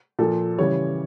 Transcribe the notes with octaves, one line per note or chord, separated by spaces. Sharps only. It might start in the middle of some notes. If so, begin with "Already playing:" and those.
A#2 F3 A4
C#3 E3 G3 C#5